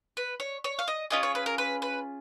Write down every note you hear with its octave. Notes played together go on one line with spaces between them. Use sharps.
B4
C#5
C#5
F5
D#5
C#4 F4 G#4 D#5
C#5
B4
A#4
B4
B4